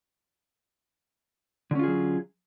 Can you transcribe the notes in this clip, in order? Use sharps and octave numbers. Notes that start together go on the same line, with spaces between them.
D3 F#3 C#4 F4 G#4